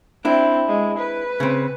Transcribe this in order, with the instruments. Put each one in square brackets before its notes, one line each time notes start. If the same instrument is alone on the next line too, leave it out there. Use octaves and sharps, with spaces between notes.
[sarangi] C4 [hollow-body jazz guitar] D4 E4
[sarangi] G#3
B4
[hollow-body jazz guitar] C#3 C4